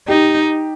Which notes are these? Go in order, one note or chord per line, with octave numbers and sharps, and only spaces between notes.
D#4 G4